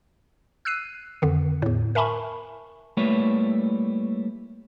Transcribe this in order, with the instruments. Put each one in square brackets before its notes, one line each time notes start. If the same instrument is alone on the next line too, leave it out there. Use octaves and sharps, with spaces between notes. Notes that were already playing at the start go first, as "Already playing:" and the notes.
[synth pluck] E6 F#6 C7 D#7
F2 D3 D#3
E2 A2
A#4 E5 G#5 A5 B5 C#6
[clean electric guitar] G3 A3 A#3 E4 B4 C#5